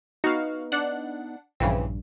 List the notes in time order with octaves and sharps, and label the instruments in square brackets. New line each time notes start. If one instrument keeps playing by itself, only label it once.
[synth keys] B3 D#4 [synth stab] F#4 F5
[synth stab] D4 F#5
[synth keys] A#1 G2 [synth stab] C#3 E3 C4